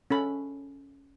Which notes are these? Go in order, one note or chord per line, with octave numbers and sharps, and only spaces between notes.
C#4 A4 B5